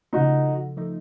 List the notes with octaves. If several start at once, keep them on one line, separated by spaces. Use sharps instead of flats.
C#3 F3 A3 D#4 F#4
F3 A3 D#4